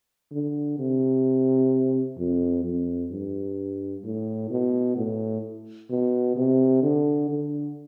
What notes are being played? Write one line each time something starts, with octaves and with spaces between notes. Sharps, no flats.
D3
C3
F2
F2
G2
A2
B2
A2
B2
C3
D3
D3